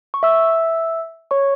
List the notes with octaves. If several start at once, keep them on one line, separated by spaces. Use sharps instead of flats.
C#6
E5 E6
C#5 C#6